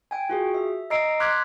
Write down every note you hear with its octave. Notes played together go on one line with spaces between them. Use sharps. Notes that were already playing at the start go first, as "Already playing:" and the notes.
G5 G#5
F4 F#4 G#4
E5
D#5 A#5 E6 C7 D7
C6 D6 F6 F#6 G#6 B6